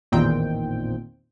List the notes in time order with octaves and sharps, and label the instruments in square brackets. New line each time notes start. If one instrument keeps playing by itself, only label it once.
[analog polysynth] A1 E2 A#2 D#3 C4 G5